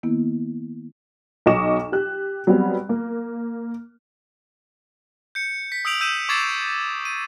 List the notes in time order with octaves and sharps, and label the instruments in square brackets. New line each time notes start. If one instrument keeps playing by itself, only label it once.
[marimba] D#3 A#3 B3 E4
[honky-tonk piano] B1 F#3 D#5 C#6 D6 E7
G4 F#6
F#3 G3 B3 C4
A#3
[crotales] G6 C#7
B6
D#6 E6 G6 D7 F7 F#7
D#6 E6 G6 D#7 E7
C#6 D6 G#6 A6 C7 E7
D#7